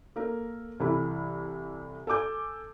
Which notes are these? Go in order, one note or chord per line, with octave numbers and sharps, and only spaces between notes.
A#3 A4 A#4
C2 E3 A4 B5
A4 G#5 D6 G6